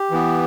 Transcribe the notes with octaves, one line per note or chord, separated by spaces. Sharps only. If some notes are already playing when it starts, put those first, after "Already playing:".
Already playing: G4
E3 B3